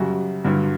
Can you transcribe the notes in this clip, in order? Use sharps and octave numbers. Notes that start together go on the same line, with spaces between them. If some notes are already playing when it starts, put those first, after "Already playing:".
Already playing: F#2 C#3 G3 F#4
G2 D3 F#3